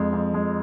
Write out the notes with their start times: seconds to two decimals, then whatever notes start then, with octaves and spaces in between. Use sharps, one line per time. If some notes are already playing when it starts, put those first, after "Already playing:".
Already playing: F2 G#3
0.12 F2
0.34 G#3